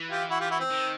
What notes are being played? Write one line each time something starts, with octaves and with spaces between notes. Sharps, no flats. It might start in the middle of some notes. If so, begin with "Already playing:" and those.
Already playing: E3
F4 G4
E4 F#4
F4 G4
E4 F#4
C4
D#3